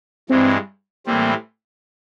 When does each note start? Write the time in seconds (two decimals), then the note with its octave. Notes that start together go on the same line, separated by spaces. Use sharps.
0.30 G2 E3 G#3 C4
1.06 A2 E3 G3 A#3 C4